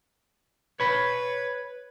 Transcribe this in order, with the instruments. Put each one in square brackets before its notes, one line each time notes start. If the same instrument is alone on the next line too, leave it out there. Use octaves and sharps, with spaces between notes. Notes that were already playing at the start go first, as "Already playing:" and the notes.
[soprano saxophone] B4 [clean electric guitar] C#5 B5